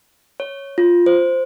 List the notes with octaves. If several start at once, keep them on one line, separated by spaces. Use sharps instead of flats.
C#5
F4
C5